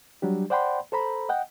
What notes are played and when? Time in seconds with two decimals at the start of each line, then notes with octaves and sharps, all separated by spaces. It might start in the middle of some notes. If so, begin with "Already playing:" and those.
0.22 F#3 G3 D4 G4
0.50 C5 D5 F#5 G5 B5 C6
0.92 A4 C5 A#5 B5
1.29 D#5 F#5 G5